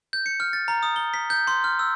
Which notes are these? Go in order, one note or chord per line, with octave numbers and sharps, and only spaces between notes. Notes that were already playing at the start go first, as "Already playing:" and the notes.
G6
C#7
F6
A6
A#5
D#6
G7
B6
G6
C6
F6
E6